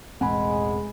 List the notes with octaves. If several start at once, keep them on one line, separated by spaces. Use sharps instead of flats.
E1 A1 G#3 C4 F#5 G#5 B5